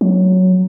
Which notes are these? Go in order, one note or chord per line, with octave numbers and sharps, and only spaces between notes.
F#3